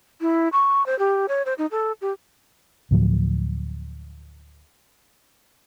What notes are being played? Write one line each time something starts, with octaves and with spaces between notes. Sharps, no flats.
E4
C#6
C5
G4
C#5
C5
D#4
A4
G4
D2 A2 F3 F#3